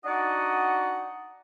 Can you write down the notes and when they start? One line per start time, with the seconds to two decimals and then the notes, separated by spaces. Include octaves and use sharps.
0.05 D4 D#4 F#4 D5 D#5 F#5